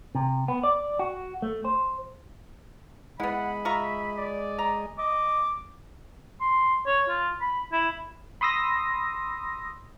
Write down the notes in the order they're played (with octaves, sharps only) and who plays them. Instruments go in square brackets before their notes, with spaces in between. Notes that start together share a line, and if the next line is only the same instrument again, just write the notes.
[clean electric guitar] C3
B3
D5
F#4
A3
C5
[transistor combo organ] G#3 D#5 [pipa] B3 E4 [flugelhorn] F#5 [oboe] B5
[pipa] F4 A#5 C#6 [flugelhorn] E5
[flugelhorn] D5
[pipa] A#5
[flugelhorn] D#5 [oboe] D6
[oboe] C6
C#5
F4
B5
E4
[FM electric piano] B5 C6 D#6 E6 A#6